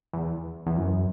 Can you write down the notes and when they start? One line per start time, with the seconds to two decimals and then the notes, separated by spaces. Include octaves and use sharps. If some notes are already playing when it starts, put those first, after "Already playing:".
0.13 E2
0.67 E2
0.77 F#2